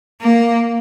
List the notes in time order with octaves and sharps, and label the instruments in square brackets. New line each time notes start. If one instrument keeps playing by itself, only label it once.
[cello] A#3